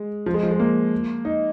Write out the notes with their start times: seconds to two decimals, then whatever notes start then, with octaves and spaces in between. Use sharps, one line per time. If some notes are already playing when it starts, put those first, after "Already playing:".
Already playing: G#3
0.26 F3
0.34 G#3
0.43 F3
0.51 G#3
0.60 A#3
1.25 D#4